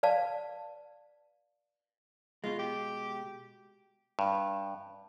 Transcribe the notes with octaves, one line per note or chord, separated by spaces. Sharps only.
B4 D5 F5 A5
B2 G#3 F4
G4
G2